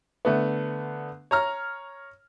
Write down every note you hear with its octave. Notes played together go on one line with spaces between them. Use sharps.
D3 A3 B3
C#5 A#5 F6